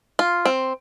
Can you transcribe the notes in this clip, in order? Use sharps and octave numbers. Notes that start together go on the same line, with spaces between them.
F4
C4